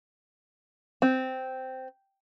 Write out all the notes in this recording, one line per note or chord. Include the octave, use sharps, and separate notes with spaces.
C4